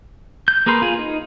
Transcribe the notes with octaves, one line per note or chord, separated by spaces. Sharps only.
G6
A#3 G#4 A#4 B4 C6
F4 G#4
D#4